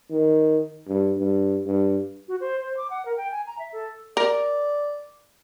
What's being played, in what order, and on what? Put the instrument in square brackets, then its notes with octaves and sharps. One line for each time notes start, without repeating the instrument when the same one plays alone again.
[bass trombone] D#3
G2
G2
G2
[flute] F#4
C5
C5
D6
F#5
A#4
G5
G#5
A#5
E5
A4
[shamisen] A#4 [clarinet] D5